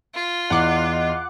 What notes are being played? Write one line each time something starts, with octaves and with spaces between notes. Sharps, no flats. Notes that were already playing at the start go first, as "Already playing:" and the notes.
F4
E2 D#5 F#5 D6 F#6